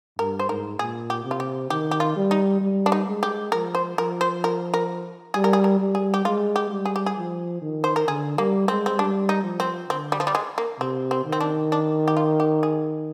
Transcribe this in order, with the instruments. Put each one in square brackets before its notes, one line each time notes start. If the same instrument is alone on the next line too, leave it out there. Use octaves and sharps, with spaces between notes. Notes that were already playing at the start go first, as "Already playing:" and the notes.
[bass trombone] G2 [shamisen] A#4
[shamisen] C5
[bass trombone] G#2 [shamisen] A#4
[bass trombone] A#2 [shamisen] G#4
[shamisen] G4
[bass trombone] C3
[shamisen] F4
G4
[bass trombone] D#3 [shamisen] G4
[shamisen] G4
F4
[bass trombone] G3
[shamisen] D#4
[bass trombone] G3
[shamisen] D4
D#4
[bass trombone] G#3
[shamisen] G4
[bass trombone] F3 [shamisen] A#4
[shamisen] C5
[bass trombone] F3 [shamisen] A#4
[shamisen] C5
A#4
A#4
[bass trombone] G3 [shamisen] G#4
[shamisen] A#4
G#4
A#4
[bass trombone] G3
[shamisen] G#4
G4
[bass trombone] G#3 [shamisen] F4
[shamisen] G4
[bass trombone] G3
[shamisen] G#4
G4
G#4
[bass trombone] F3
D#3
[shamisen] C5
A#4
[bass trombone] D3 [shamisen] G#4
[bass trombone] G3 [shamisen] A#3
[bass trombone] G#3 [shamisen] C4
[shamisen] C4
[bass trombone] G3 [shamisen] D4
[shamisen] D#4
[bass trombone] F3
[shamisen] C4
[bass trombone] D3 [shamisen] C4
[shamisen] G3
F3
G3
G#3
A#3
[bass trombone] C3 [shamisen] C4
[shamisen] C4
[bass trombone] D#3
[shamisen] C4
D4
D4
G4
F4
G4
G#4